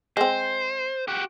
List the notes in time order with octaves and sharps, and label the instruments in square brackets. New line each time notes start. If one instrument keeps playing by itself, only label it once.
[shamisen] G#3 C4 [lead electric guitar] C5
[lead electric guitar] F#4 G4